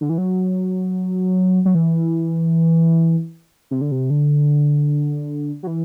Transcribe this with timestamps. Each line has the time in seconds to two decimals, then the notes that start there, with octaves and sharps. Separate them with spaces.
0.01 D3
0.09 E3
0.18 F#3
1.65 F#3
1.75 E3
3.71 C3
3.81 D3
3.92 C3
4.10 D3
5.63 F#3
5.67 E3